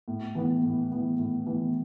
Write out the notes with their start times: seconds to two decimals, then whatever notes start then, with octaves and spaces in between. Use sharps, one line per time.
0.08 A2
0.35 E3 B3
0.64 A2
0.91 E3 B3
1.19 A2
1.46 E3 B3